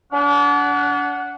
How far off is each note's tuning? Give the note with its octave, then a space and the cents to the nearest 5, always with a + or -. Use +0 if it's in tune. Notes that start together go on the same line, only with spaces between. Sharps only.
D4 -40 F#5 +0